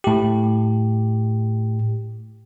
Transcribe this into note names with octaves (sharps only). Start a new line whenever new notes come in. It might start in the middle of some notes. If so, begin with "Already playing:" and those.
A2 G4